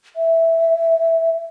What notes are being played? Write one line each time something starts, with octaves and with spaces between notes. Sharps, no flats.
E5